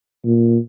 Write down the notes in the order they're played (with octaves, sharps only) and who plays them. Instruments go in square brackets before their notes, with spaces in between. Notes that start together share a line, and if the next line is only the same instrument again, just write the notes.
[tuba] A#2